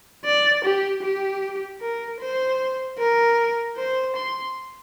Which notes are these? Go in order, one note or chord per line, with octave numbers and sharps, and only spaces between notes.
D5
G4
G4
A#4
C5
A#4
C5
C6